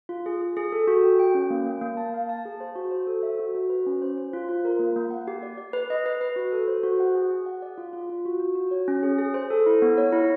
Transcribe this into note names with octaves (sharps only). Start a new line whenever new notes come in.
F4
G#4
G#4
G#4
A4
F#4
G5
G5
C#4
A#3
A#3
A#3
A5
F5
A5
G#4
C5
F#4
C5
A4
E5
F#4
F#4
B4
C#4
C5
C5
F4
F4
A#4
A#3
A#3
F#5
G4
D5
D5
B4
D#5
B4
B4
F#4
A4
C5
F#4
F#5
G#4
G#4
F#5
D5
F4
F4
F4
F#4
F#4
F#4
C#5
C#4
G#4
G#4
C5
A4
E4
B3
C#5
E4